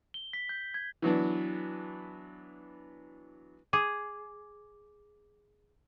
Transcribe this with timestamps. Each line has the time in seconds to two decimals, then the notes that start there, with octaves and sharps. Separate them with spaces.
0.14 G7
0.33 B6
0.49 G6
0.74 G#6
1.02 E3 F#3 B3 D4
3.73 G#4 D6